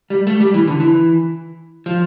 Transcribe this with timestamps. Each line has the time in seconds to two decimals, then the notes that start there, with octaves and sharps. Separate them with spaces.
0.10 G3
0.27 A3
0.40 G3
0.54 E3
0.67 D3
0.80 E3
1.86 F3